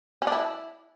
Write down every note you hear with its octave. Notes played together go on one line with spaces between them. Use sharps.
C#4
D4
E4